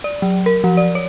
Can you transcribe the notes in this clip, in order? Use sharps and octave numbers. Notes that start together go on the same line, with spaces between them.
D5
F#3
A#4
F3
D5
C#5